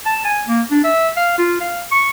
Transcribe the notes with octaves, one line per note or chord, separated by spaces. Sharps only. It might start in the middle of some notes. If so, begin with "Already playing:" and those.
A5
G#5
A#3
D4
E5
F5
F4
F5
C#6